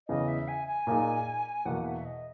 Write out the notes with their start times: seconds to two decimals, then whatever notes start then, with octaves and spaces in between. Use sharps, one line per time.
0.08 E2 C#3 E3 D#5
0.28 E5
0.48 G#5
0.67 G#5
0.87 A#2 A#3 D#4 G#4
1.65 E2 B2 A#3 F#5
1.86 E5
2.05 D#5